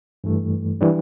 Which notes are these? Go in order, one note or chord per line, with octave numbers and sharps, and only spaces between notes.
G2 E3 A3
E3 G3 D4